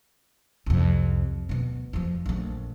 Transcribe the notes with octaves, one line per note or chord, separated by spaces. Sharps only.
C2 F2
D2 B2
F2 F3
A#1 A3